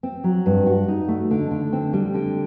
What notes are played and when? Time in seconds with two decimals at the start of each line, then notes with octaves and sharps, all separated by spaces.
0.03 C4
0.24 F#3
0.46 G2
0.67 F#4
0.88 D#4
1.08 A3
1.31 D3
1.51 D3
1.73 C4
1.93 G3
2.14 D3